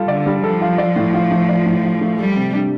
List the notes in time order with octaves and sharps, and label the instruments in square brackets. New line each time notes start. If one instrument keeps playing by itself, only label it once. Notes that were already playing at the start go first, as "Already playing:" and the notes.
Already playing: [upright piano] G3 F4 A4
[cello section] D3 [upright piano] D5
[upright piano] G3
[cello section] F3 [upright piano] A4
[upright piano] F4
D5
A2
F4
A3
D5
A2
F4
A3
[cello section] G3 [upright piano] A4
[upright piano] C3
D4